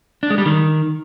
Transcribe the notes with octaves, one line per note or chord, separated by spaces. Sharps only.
D4
G#3
G3
D#3